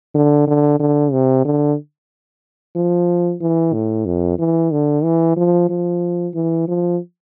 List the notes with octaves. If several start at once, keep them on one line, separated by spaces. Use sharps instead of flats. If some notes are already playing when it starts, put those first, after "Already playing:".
D3
D3
D3
C3
D3
F3
E3
A2
F2
E3
D3
E3
F3
F3
E3
F3